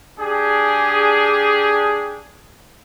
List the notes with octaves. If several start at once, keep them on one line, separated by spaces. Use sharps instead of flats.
D4 G4 G#4